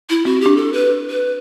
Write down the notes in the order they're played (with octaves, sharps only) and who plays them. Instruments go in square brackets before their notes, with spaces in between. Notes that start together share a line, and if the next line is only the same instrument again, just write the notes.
[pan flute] E4
[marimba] C4 [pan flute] F#4
[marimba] D4 [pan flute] G4
[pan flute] A4
B4
B4